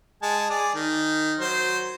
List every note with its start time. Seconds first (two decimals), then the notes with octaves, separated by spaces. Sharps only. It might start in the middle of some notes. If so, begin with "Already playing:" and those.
0.22 G#3 G#5 A5
0.50 G#4 D5
0.75 D#3
1.40 F#3 C5